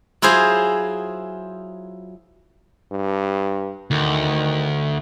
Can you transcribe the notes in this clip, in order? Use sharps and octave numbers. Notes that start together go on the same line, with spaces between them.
F#3 E4 F4 G#4 C5
G2
D2 D#3